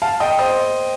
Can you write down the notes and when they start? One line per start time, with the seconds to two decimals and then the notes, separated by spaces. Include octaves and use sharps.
0.02 F5 A5
0.20 D#5 G5
0.39 C5 D#5